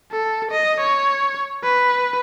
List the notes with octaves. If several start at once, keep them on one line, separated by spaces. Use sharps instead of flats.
A4
D#5
C#5
B4